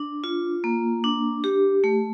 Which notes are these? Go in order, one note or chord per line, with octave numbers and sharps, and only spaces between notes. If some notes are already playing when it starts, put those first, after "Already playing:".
Already playing: D4
F4
A#3
D4
G4
A3